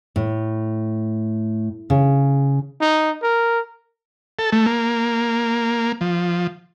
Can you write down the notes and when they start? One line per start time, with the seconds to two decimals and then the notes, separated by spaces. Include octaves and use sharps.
0.16 A2
1.90 C#3
2.81 D#4
3.23 A#4
4.39 A4
4.52 A3
4.66 A#3
6.01 F3